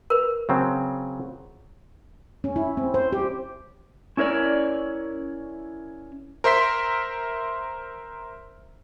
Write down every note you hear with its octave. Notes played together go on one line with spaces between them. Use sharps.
A#4 B4
C#3 F#3 C4
C#4
E4
C4
C5
G4
C#4 E4 A#4 C#5 D5
A#4 C5 E5 C6 B6